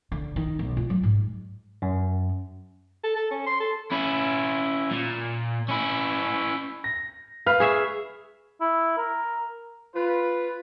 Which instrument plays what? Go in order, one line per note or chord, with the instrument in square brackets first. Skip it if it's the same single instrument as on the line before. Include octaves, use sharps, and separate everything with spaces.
[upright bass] D3
D#3
B1
F4
F#3
G#2
[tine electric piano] F#2
[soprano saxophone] A4
A4
C#4
C6
A4
[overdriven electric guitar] C#4 E4
A#2
C#4 E4
[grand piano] A#6
[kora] B4 [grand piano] F5 F6
[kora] G#4 C#5 E5
[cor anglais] E4
A#4
[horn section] F4 B4